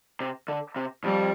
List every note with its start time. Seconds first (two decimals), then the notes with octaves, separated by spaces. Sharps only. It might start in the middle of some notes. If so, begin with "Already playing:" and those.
0.20 C3
0.48 D3
0.76 C3
1.04 F2 G3